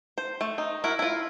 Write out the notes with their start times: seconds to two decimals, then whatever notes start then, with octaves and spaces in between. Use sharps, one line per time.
0.18 C5
0.41 A3
0.58 D#4
0.84 E4 F#4 A#4
0.99 E4 F4